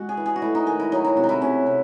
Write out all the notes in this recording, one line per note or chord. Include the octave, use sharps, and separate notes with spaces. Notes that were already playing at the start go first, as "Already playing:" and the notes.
Already playing: G#3 F#4
G#4
E3
G#4
F#4
A3 E4
D#4
D#3 G#4
E4
F#3 D#4
E4
C3 F#4
D#4
E4
C3 C#4
C3